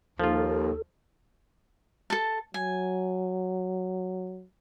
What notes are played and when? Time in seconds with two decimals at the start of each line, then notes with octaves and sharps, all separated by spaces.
0.20 D#2 F3 F4 A4
2.10 A4 A5
2.54 F#3 G#5